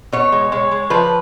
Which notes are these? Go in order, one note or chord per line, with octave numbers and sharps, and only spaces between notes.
B2 C#5
G#3
G#3 C#5
G#3
F3 B4